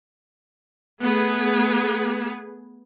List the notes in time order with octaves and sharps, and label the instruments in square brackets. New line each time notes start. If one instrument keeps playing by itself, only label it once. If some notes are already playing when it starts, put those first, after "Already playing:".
[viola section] A3 B3 G#4